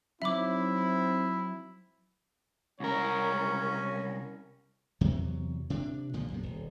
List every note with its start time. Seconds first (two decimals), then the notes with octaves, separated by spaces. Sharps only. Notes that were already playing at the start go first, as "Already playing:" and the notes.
0.22 F#3 C4 D#4 E4 E5 B5 D6
2.80 C2 C#4 A#4 C#5
5.01 E2 C3 F#3
5.70 C3 D4
6.13 B1 A#2 D3 F3
6.30 B1 F#2 C3
6.43 D#1